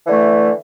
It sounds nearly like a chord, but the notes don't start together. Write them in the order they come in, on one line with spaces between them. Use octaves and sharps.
E3 D3 A3